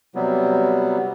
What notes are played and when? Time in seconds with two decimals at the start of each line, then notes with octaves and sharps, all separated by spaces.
0.15 C3 F#3 G3 B3